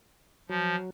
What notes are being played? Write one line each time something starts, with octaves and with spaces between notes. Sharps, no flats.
F3 F#3